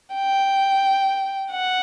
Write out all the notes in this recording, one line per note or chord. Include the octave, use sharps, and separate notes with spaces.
G5
F#5